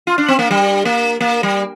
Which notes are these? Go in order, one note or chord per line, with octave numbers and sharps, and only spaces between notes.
F4
D4
C4
A#3
G3
A#3
A#3
G3